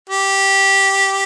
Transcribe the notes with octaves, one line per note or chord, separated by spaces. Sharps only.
G4